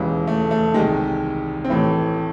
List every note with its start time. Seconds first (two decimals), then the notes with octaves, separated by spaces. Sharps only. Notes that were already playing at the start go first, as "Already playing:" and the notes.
Already playing: E1 D#2 C#3 E3 G#3
0.27 A3
0.51 A3
0.74 C2 C3 D#3 G#3
1.65 C4
1.70 A1 A2 E3 A3